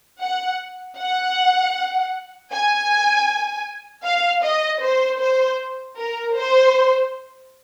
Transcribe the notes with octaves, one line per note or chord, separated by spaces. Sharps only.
F#5
F#5
G#5
F5
D#5
C5
C5
A#4
C5